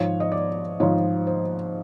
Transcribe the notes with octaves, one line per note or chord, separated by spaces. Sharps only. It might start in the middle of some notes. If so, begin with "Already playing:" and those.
Already playing: G#2 F3 C#5
D#5
D5
G#2 F3 C#5
C5